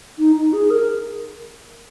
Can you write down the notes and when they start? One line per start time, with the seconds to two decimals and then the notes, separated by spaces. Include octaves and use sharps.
0.18 D#4
0.36 D#4
0.53 G#4
0.71 A#4